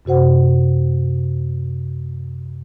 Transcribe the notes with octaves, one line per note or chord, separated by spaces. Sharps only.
F#2 C3 F#4 C5 F#5